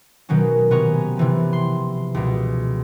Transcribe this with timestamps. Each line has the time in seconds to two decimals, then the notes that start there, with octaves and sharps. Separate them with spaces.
0.29 B2 D#3 F#3 A#3 C#4
0.71 C3 B3 C#4 A#5 C#6
1.17 C3 E3 F3
1.53 C6
2.14 C#2 B2